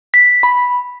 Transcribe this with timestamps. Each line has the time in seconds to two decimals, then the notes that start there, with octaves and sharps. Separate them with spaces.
0.14 B6
0.43 B5